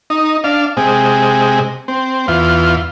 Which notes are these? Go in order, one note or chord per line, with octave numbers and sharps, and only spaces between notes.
D#4
D4 F5
C3 G#3
C4
E2 F4